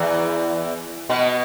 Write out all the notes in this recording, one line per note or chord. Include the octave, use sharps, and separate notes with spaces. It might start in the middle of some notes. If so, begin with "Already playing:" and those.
Already playing: E2 E3
B2 B3